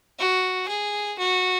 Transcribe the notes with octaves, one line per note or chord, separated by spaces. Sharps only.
F#4
G#4
F#4